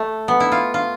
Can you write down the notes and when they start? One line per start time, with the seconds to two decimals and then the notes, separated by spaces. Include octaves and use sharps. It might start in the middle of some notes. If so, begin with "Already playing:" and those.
Already playing: A3
0.28 B3
0.40 E4
0.52 F4
0.74 F4